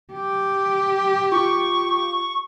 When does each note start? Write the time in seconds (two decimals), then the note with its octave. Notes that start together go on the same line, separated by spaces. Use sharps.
0.13 G4
1.32 F4 C#6